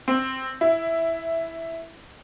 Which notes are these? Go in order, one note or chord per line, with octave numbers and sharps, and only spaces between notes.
C4
E4